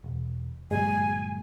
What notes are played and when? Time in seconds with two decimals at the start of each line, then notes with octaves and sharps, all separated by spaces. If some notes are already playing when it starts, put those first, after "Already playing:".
0.04 E1
0.71 G1 A#2 F#3 G#3 G#5